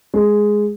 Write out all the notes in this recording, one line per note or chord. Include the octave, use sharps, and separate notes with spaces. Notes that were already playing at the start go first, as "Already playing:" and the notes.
G#3